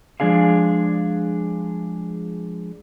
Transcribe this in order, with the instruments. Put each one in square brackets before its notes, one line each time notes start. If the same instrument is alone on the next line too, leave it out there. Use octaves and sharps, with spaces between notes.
[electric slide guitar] F3 G#3 D4 G#4 F5